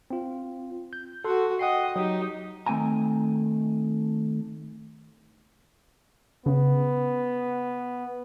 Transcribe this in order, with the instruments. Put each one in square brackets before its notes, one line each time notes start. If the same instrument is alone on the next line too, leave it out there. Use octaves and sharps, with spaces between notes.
[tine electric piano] C4 F4
G6
[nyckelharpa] F#4 F#5 [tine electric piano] A4 C6
[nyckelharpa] D#5 [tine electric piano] F#5 G5 C7
[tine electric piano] F#3 [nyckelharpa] D#4 G4
[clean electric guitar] D#3 A3 C4 G5 G#5 A#5
[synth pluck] C#3 [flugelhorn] B3